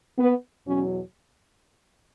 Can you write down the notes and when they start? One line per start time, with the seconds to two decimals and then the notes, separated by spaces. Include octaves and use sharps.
0.18 B3
0.67 E2 B2 F#3 C#4